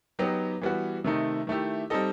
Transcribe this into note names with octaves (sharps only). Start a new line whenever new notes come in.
F#3 B3 D#4 G4
E3 G3 B3 F#4
C3 D#3 A3 D#4
D#3 A3 E4 G4
G3 C4 D#4 A4 D#5